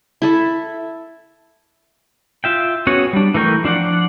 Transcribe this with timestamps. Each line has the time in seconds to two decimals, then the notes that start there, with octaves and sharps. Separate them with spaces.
0.22 E4 A4 E5
2.44 F4 E5 G5
2.87 B3 C#4 F#4 G#4 C#5
3.13 G3 D4
3.34 E3 A3 A#4 G5 C#6
3.64 F3 D4 F4 D5 F#5